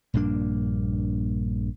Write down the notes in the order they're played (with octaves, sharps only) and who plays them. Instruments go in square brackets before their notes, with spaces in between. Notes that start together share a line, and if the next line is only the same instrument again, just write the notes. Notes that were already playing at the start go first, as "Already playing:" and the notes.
[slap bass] A#1 G2 A#3 D4